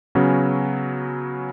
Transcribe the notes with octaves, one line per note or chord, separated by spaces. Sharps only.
C#3 F#3 B3 C#4